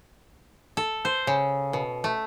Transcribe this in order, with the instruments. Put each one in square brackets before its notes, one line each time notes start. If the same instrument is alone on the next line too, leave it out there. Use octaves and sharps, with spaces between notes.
[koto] A4
C5
C#3
B2
A3